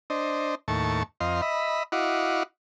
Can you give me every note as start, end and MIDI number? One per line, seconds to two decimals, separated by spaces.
0.10 0.55 62
0.10 0.55 72
0.10 0.55 75
0.68 1.03 39
0.68 1.03 45
0.68 1.03 81
0.68 1.03 85
1.20 1.41 41
1.20 1.41 75
1.20 1.41 77
1.20 1.41 84
1.42 1.83 75
1.42 1.83 76
1.42 1.83 83
1.92 2.43 64
1.92 2.43 66
1.92 2.43 75
1.92 2.43 77
1.92 2.43 78
1.92 2.43 86